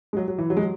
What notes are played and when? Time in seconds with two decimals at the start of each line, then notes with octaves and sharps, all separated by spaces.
0.13 G#3
0.17 F#3
0.28 F#3
0.38 E3
0.50 F#3
0.57 G#3
0.61 F#3